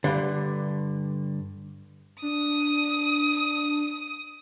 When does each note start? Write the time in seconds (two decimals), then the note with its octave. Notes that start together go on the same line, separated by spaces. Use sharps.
0.04 G2 D3
2.22 D4 D#6